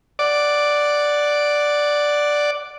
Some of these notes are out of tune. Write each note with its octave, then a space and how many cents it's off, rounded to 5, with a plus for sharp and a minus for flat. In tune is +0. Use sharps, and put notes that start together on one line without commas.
D5 +0 F#5 +0 D6 +0